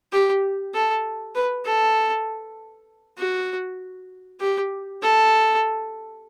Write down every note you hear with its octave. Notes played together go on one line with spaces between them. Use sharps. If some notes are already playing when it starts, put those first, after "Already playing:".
G4
A4
B4
A4
F#4
G4
A4